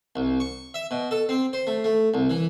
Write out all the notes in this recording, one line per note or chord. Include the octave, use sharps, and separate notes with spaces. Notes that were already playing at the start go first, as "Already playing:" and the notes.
C2
C#6
E5
B2
A4
C4
C5
A3
A3
C2
E3